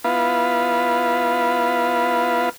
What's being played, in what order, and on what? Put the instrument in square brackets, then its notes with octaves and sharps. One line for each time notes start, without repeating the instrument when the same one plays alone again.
[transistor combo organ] B3 E4 F4 B4 F5